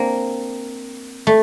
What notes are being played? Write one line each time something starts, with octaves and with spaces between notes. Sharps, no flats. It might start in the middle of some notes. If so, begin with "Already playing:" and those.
Already playing: A#3 C4 D4
A3